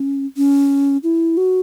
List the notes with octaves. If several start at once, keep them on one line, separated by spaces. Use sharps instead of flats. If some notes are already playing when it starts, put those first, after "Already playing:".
Already playing: C#4
C#4
E4
F#4